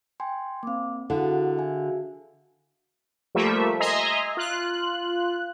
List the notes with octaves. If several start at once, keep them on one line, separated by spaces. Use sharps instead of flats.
G5 G#5 C6
A#3 C4 F5 D6
D3 E4 F#4 G#4 A4 F5 F#5
E5 G#5
F3 G3 A3 A#3 E5
D#5 E5 G#5 A#5 C6
F4 F#6